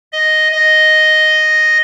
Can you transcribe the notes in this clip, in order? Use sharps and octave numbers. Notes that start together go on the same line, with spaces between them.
D#5
D#5